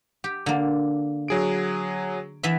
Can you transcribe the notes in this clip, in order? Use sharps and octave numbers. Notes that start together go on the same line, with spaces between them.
G4
D3 A#3
F#3 G#4 D7
E3 B3 E5